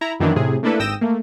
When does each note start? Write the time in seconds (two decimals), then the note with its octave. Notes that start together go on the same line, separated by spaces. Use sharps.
0.01 E4 A#5
0.20 F#2 D#3 E3 A#3 D4
0.36 A2 C3 G#4
0.63 A3 A#3 D4 E4 A4 B4
0.79 G#1 G5 D#6 E6 A#6 E7
1.01 A3 A#3